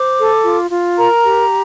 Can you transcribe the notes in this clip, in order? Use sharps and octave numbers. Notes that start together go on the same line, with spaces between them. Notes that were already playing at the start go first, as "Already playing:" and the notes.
Already playing: C5 D6
A4
F4
F4
A#4 A#5
G4